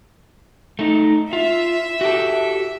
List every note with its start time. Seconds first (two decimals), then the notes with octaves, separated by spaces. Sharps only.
0.79 A3 D#4
1.33 F4 E5
2.01 F#4 G4 A4